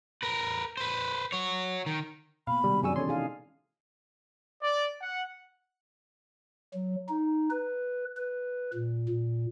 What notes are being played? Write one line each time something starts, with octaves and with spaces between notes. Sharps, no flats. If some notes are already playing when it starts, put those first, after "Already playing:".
A#4 B4
B4 C5
F#4 C#5
D#3
B2 A#3 F5 B5
C3 D#3 G3 G#3
F#2 G#4 D5 G#5 C#6 E6
E3 C#4 A4 C#5 C6
D#4 G#4 F5 G#5
D5
F#5
F#3
D#4
B4
B4
A#2
A#2